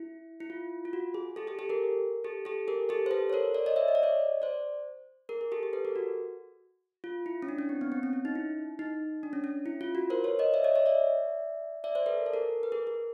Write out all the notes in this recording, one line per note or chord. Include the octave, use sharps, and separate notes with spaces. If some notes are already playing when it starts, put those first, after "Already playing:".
Already playing: E4
E4
F4
F4
F#4
G#4
G4 A4
G4 A4
G4 A4
G#4 A#4
G4 A4
G4 A4
G#4 A#4
G4 A4
C5
A4 B4
C#5
A#4 C5
C5 D5
C#5 D#5
D5 E5
D#5
D5
C#5 D#5
C5 D5
G#4 A#4
G#4
G4 A4
G4
A4 B4
G#4 A#4
F#4
F4
E4
C#4
D4
C#4
C4
B3
C4
C#4
C#4
D#4
E4
D#4
D4
C#4
C#4
E4
F4
F#4
A#4 C5
B4 C#5
C#5 D#5
D5 E5
C#5 D#5
C#5 D#5
D5 E5
D5 E5
C5 D5
A4 B4
A#4
A4
G#4 A#4
B4
G#4 A#4
G#4